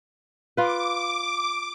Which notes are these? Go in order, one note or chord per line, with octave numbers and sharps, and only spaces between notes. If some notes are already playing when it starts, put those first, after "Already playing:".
F4 B4 D6